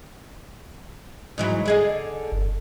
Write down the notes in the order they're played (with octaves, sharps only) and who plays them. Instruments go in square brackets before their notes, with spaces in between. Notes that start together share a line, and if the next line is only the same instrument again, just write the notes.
[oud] G#2 E3 F#3
D3 G#4 D#5
[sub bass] G1